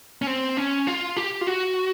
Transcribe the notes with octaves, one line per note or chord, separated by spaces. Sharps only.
C#4
C4
C#4
F4
G4
F4
F#4